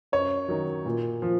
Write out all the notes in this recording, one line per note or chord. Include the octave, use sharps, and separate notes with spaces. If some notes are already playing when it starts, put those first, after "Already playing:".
F#2 C#5
D#3 F#3
A#2
F3